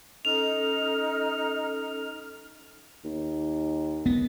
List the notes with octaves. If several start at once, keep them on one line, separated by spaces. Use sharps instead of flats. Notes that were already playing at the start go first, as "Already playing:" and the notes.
C#4 D#4 A4 D#5 F6 F7
D#2
B3